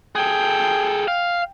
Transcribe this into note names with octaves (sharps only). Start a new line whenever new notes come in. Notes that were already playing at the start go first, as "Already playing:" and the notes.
G#4 A4 G5
F5